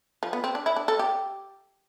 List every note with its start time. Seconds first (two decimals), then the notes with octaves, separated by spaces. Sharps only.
0.23 F3
0.33 B3
0.44 C4
0.55 D4
0.66 E4
0.76 D4
0.88 A4
0.99 G4